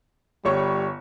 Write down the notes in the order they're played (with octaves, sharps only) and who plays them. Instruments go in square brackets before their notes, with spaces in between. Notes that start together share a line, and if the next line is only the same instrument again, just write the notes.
[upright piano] G1 C#5 C#6 [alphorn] G3